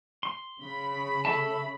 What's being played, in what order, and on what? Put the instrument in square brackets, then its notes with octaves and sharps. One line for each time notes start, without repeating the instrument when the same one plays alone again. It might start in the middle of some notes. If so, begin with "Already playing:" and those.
[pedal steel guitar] C6
[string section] C#3 B5
[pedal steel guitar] A4 E5 A5